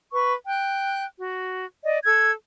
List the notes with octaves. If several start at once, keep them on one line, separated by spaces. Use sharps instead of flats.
B4 C#6
G5 F#6
F#4
D5 D#5
A4 E6 G#6